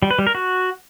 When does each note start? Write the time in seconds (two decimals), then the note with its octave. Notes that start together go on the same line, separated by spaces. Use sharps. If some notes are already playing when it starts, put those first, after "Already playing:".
0.02 G3
0.11 B4
0.19 G3
0.27 A#4
0.35 F#4